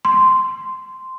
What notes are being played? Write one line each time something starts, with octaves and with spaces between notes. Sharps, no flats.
C6